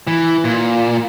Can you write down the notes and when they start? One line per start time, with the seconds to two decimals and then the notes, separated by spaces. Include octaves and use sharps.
0.07 E3
0.44 A#2